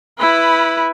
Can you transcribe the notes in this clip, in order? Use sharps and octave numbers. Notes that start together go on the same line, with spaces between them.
E4 B4